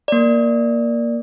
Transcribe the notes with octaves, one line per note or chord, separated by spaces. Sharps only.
A#3 D5